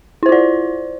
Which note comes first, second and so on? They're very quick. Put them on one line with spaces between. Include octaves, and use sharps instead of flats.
E4 C5 F4 D5